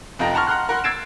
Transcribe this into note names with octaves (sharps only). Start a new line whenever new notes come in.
F1 F4 A4 D#5 G5 A#5
F#5 A5 A#5 C6 C#6 F6
F#5 A#5 C6 F6 F#6
A#4 F#5 B5 C6
E6 G#6 A6 C7 D7 E7